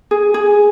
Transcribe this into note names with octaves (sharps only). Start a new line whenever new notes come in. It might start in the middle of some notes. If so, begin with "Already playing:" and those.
G#4
G#4